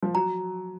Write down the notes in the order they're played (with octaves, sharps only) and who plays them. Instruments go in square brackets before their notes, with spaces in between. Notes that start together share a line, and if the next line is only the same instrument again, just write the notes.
[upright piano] F3
[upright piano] F#3 [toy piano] A#5